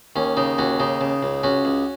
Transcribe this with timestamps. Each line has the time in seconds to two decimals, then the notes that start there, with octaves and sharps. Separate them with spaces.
0.16 D#2 C#4
0.37 C#3 D#4
0.58 D#2 C#4 F#4
0.80 C#3 D#4
1.01 C#3
1.23 C#2
1.43 C#2 C#4 F#4
1.65 C#2